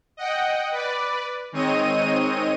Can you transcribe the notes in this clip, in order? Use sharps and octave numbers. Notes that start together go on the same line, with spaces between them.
D#5 F#5 G5
B4 D5
D#3 G#3 C4 C#5 D#5 D#7